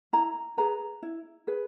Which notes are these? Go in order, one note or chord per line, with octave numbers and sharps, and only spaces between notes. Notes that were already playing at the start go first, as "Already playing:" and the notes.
E4 A#5
G#4 B4 A#5
E4
G#4 B4